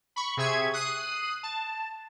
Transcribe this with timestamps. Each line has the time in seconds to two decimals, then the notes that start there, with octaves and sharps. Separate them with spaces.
0.16 B5 C#6
0.37 C3 G#4 E5 C#6 G#6
0.73 D#6 F#6 C7 D#7
1.43 A5